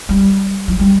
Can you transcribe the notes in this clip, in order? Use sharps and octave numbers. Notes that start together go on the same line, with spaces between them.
G3
F#3
G3